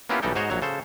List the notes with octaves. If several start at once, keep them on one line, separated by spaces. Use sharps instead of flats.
A#3 B3 C#4 E4 F4 G4
B1 E3 G3 D#4 A4 G5
G#2 F#4 C5 C#5 D#5
A#1 F#3 C#5
C#3 A4 C5